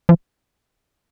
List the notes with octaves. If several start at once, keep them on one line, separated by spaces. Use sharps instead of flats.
F3